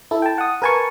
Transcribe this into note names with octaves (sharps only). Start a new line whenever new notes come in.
E4 A4
G5 A5
F#5 D#6
A#4 B4 G#5 A5 C#6